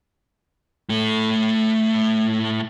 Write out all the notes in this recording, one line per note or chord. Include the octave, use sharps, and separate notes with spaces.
A2 A3